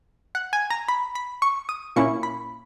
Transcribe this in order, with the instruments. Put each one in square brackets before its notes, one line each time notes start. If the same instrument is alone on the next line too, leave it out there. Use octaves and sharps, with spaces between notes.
[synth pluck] F#5
G#5
A#5
B5
B5
C#6
D#6
A#2 A#3 C#4 E4 C#6
B5